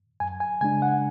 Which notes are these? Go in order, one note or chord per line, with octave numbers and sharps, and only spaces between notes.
F#2 G#5
G#5
C#3 G#3 D4 G#5
F#5